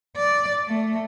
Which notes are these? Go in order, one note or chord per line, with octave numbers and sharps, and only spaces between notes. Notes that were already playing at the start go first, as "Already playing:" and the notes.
D5
A3